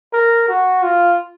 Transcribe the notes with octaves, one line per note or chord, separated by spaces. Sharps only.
A#4
F#4
F4